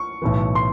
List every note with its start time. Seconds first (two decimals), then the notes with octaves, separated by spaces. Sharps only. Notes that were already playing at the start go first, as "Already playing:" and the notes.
Already playing: C#6
0.22 B1 A2 E3
0.55 C6